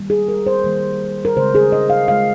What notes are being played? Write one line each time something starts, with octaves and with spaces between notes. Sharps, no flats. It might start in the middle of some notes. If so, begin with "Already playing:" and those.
Already playing: D#3 G3 A#3
G#4
A#4
C5
D#3 G3 A#3
A#4
C#3 G#3 C5
G#4
D#5
F5
C#3 G#3 F5